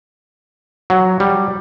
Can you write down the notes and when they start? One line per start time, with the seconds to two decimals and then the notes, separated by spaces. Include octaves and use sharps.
0.90 F#3
1.20 G3